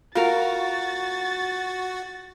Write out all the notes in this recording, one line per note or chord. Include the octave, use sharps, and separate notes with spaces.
F4 F#4 A#4 F5 A6